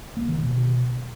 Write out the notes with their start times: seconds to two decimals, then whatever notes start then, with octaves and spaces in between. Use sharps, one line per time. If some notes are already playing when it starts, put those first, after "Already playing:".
0.17 A#3
0.28 D#3
0.40 B2